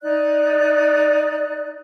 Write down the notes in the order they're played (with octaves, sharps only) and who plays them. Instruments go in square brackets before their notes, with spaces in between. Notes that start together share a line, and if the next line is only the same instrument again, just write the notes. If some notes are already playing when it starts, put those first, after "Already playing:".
[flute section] D#4 D5 F#6